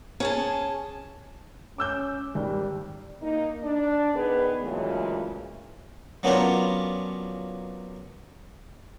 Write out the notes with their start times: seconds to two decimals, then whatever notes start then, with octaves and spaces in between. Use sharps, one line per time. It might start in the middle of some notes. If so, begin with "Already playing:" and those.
0.20 C#4 G#4 A5
1.78 C#4 D6 E6 G6
2.35 G#1 G3
3.22 A#3 D#4
3.63 D4 D5
4.14 D#3 B3 G#4 B4
4.63 A#2 C#3 E3 F#3 G#3 A3
6.23 F#3 A#3 B3 C#4 D4 F4